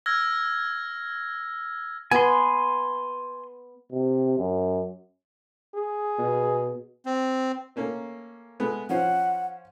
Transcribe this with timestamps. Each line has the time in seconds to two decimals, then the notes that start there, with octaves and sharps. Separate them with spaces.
0.06 E6 F6 G#6 A#6
2.11 B3 G#5 C6
3.92 C3
4.38 F#2
5.75 G#4
6.19 B2
7.06 C4
7.76 A3 A#3 C#4
8.60 G#3 A3 B3
8.89 F3 C#4 C5 F#5